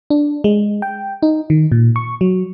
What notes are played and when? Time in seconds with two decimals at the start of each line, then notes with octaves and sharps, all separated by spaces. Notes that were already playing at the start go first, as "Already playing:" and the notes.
0.10 D4
0.44 G#3
0.82 G5
1.23 D#4
1.50 D#3
1.72 A#2
1.96 C#6
2.21 F#3